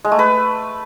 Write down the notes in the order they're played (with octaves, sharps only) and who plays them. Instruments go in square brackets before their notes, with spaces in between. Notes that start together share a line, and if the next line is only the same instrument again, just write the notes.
[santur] G#3
A3
B4